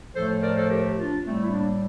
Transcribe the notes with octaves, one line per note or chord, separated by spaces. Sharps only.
A2 F3 A3 A4 C5
A#4 D5
A4 C5
G4 A#4
D4 F4
A2 G3 A3 C4
E4
A#3 D4